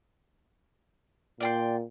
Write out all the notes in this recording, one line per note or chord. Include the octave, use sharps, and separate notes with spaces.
A#2 D5 G5 C6